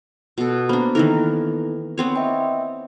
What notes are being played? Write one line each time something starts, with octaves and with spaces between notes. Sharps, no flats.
B2 A4
A#3 B3 D4 C5 B5
D#3 E3 B3 D#4 A4 A#4
B3 C4 C#5
D#5 E5 G5